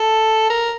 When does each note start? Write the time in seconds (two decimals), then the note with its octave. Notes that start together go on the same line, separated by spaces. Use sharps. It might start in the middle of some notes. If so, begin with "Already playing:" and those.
Already playing: A4
0.50 A#4